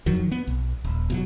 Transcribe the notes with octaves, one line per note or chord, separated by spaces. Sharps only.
F2 D#3 F#3
B3
B1
D#1
B2 F3 F#3